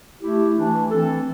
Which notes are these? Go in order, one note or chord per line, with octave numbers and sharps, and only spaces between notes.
A3 E4 G4
E3 A3 D4
E3 C4 A4